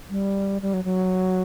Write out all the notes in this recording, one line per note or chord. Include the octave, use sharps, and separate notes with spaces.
G3
G3
F#3
F#3